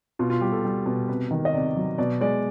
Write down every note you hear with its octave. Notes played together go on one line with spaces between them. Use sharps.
B2 F4
F4
G3 G4
A4
G3
B2
C3 B4
D#3
D#5
C3 D5
F#3
B2 D5
G#3 D5